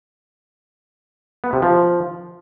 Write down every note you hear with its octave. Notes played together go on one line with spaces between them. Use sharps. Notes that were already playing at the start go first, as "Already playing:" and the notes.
B3
C3
F3